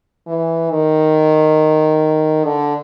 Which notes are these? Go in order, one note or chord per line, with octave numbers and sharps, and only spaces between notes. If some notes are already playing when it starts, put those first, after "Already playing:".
E3
D#3
D3